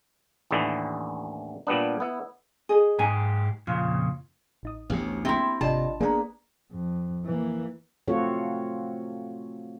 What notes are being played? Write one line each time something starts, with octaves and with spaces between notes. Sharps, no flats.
A1 D#2 D3 E3 E4
A#2 G3 B3 D4
B3 E4
G#4 D#5
G#2 G#3 D#4 G4 G#5 A#5
F2 A#2 C#3 F4
A1 D#4 D#6
A1 D2 A2 B3 G4
G#3 A#3 C4 E4 G4 E5 B5 C6
G#1 C3 D4 F4 D5 D#5 A5 C6
A#3 B3 D4 G#4 D5 A#5
F2
E3 A#3
A3 C4 F4 F#4 A4 C#5